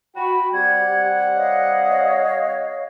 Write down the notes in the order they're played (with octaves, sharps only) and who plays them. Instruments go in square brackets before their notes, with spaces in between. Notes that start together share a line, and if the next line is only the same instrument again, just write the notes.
[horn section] F#4 [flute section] G5 B5
[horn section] G3 C4 F#5 [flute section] G4 G#6
[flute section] C#5 D#5 F5